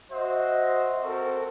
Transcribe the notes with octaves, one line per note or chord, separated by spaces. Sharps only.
F#4 C5 D#5 E5
C4 F#4 A4 A#4